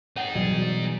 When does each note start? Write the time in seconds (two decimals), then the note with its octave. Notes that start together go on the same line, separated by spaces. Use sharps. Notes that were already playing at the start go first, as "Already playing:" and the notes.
0.16 D#4 G#4 C#5 F#5
0.35 B2 E3 F#3 G3 D5 D#5